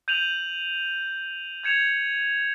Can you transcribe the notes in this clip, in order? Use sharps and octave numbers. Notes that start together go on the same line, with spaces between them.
G6 D#7 F7 F#7
G6 G#6 C#7 E7 F7